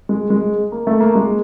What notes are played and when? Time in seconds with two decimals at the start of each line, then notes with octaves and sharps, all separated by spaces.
0.09 G#3
0.30 G#3
0.72 A#3
0.87 A3
1.00 A#3
1.15 G#3